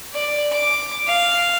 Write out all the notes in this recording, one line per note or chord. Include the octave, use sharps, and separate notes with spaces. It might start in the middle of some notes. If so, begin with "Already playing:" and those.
D5
D6
F5